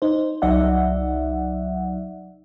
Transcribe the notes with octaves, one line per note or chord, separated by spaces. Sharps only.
D#4 C5
C2 F#3 D#4 D5 E5 F#5